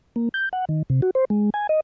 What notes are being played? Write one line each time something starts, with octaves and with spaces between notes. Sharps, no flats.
A#3
G6
F#5
D#3
C3
F#4
C5
G#3
G#5
D#5